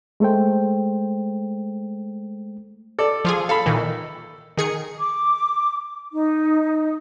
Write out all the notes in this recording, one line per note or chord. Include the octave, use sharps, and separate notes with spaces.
G#3 A3 A4 C5 G5
A4 D5
F3 F4 G#4
A4 F5 B5
A#2 D#3 E3
D#3 G#4 C#7
D6
D#4